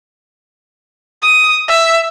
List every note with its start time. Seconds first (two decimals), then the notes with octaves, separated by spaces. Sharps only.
1.22 D#6
1.68 E5